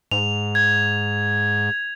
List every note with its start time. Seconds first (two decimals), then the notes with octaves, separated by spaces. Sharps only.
0.11 G#2 F7
0.55 G#6